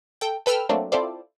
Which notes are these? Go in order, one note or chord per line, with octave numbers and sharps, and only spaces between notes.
A4 G5
A4 B4 G5 E6 F6
F#3 A3 A#3 C4 D4
C4 E4 F4 A4 C5 D5